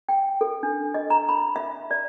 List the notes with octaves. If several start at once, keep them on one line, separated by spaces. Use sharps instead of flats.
G5
A4
D4
D#5
A#5
B5
E5
D5